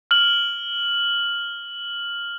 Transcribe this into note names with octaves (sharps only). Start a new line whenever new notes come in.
F6 F#7